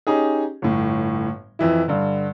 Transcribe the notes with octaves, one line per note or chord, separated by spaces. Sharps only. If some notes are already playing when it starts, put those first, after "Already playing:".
C#4 D#4 G4 G#4
G1 A2
F2 E3 E4
G2 D3